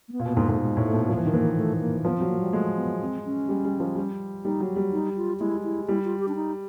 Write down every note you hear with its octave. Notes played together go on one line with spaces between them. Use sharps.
A#3
B3
A#2
B2 B3
G#2 A#3
G#2 A3
G#3
A2
A3
B2
F3
E3
D#3
E3 A#3
A3
A#3
F3 B3
C4
F#3
A#3
G3
G#3 A3
B3
C4
C#4
G3
G3
F3
G3
G3 D#4
F#3
G3
D#4
F4
G#3 E4
E4
G3 E4
F4
G4
D4
D#4